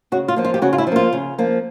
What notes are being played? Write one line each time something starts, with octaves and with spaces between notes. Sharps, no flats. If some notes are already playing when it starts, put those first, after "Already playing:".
C#3 F#4
F4
F3 A#3
F4
G4
C#3 F#4
F4
E4
F3
A#3 F4
C#3
F3 A#3